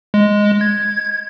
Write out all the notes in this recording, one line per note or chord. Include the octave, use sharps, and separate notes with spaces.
G#3
G#6